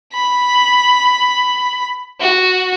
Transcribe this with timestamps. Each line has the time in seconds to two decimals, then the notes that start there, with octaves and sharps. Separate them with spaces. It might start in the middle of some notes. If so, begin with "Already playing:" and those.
0.13 B5
2.20 F#4